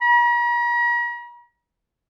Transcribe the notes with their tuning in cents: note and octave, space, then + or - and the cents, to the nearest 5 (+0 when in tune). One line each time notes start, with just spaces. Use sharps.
A#5 +45